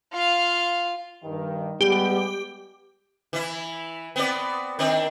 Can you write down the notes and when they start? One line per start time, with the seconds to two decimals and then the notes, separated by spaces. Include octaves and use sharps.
0.13 F4 F5
1.24 G2 D#3
1.81 G3 G#3 B3 G4
3.33 E3 E4
4.16 B3 C4 D5
4.79 D#3 C4 D4